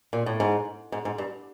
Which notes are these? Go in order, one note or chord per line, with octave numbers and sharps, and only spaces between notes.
A#2
A2
G#2
G#2
G#2
G2